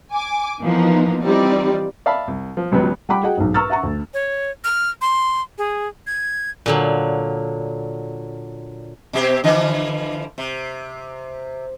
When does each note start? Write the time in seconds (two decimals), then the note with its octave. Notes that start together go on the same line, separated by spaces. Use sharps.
0.12 G#5 D6
0.62 E3 F3 A#3 B3 D#4
1.22 E3 G3 C4 D#4 F4 D5
2.06 D5 E5 F5 A5 B5
2.28 C2
2.57 F3
2.72 G#1 C#2 F#3 G3 B3 F#6
3.09 G3 F#5 G5 B5 D6
3.23 F#4 G#4 D#5 F#5 G5
3.37 B1 G#2
3.54 B4 A#5 C#6 E6 F6 A6
3.70 E5 F#5 A#5 C#6
3.83 D2
4.14 C#5
4.64 F6
5.01 C6
5.58 G#4
6.07 G#6
6.66 A#2 D3 F#3
9.13 B2 C4 G4
9.44 D3 E3 F3
10.38 C3